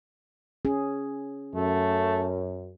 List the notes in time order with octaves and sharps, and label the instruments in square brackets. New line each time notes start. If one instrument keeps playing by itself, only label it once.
[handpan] C#4 G#4
[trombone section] F#2 [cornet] A3